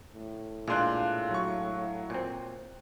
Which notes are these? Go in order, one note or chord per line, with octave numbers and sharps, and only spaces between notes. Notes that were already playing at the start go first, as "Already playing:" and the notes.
A2
A#2 G#3 D4 F5 C6 F#6
F#3 C#6
A#2 C4